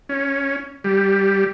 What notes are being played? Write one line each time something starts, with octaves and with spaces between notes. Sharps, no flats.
C#4
G3